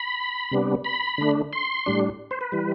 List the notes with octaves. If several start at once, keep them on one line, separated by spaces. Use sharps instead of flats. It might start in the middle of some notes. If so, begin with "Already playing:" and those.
Already playing: B5
C3 G3 B3 D4
B5
D3 A3 D4
C6
A2 G3 D4
C5
B4
E3 G3